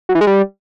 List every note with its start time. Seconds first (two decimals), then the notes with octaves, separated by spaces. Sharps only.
0.09 F#3
0.15 E3
0.21 G#3
0.27 G3